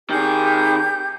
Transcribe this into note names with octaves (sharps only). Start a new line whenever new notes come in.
D#3 G4 G#4 G6